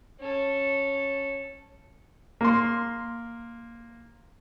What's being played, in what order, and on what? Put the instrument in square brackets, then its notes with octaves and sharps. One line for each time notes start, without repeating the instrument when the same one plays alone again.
[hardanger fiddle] C#4 A4
[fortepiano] A#3 C6